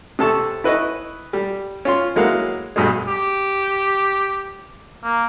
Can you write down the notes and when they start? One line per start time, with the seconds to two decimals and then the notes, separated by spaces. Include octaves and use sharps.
0.19 C3 A4 A5 C#6
0.64 E4 B4 D#5 C#6
1.33 G3
1.85 C#4 F4 C6
2.16 F#3 G#3 A#3 E4 F5 F#5
2.76 B1 G2 B2 G#3
3.08 G4
5.04 A#3